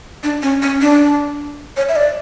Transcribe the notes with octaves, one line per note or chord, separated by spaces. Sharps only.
D4
C#4
C#4
D4
C#5
E5
D5